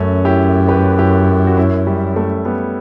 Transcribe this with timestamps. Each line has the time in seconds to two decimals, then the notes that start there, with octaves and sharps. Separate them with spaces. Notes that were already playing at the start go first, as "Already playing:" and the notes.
Already playing: F#2 A3 C#4
0.25 E4 G4
0.68 G4 B4
0.98 E4 G4
1.47 F#4
1.57 C#4 E4
1.87 G3
2.16 A3
2.45 G3 B3